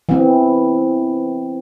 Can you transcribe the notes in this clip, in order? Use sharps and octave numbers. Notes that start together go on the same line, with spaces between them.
E3 C4